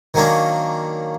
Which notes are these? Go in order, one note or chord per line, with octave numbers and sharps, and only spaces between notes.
D#3 F#3 A#3 C#4 D4